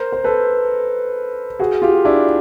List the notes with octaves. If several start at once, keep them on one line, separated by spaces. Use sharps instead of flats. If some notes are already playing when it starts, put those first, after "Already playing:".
Already playing: A#4 C5
C5
A4 B4
F#4 G#4
F4 G4
D4 E4